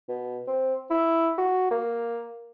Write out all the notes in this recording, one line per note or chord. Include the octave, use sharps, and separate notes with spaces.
B2
C4
E4
F#4
A#3